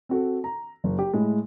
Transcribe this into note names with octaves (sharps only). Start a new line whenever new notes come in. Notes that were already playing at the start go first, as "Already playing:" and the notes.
C4 F#4 A4
A#5
F#1
G4
A2 G#3 E4